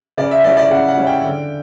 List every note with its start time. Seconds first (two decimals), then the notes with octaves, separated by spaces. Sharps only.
0.17 C#3 D5
0.31 E5
0.44 G3 C#4 E4 D5
0.57 D5
0.70 C#3 F#5
0.88 F#5
0.97 G3 C#4 E4
1.07 G5
1.24 D3